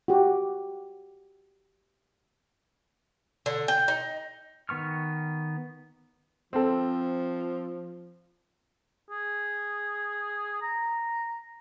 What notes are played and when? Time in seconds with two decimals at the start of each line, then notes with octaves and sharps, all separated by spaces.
0.08 F#4 G4
3.46 D3
3.68 G5
3.88 D#4
4.69 D#3 B3 C#6 F6
6.53 F3 C4 A4
9.11 G#4
10.62 A#5